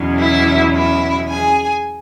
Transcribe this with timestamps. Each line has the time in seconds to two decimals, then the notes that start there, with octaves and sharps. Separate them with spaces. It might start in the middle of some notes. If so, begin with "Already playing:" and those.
Already playing: E2 B2 F#3 C#4
0.20 E4 E5
0.75 E4 E5
1.29 G#4 G#5